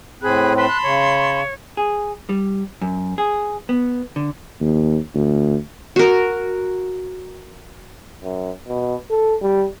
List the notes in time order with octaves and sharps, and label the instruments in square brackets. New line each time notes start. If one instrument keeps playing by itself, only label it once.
[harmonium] A2 C4 [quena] G#4 [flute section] B5 F#6
[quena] B4 [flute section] A5 B5 C6
[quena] F#6
[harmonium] C#3 [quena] C#5
[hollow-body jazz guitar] G#4
G3
F#2
G#4
B3
D3
[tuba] D#2
D2
[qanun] F#4 A#4
[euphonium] F#2
B2
A4
G3